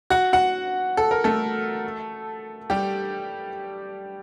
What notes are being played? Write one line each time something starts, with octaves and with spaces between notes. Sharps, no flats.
F#4 F#5
F#4 F#5
A4
A#4
A3 A4
G3 G4